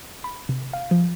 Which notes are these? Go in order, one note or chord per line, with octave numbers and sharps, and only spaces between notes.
B5
C3
F5
F3